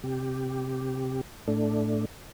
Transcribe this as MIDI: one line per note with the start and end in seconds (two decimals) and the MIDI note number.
0.04 1.21 48
0.04 1.21 67
1.48 2.05 45
1.48 2.05 57
1.48 2.05 62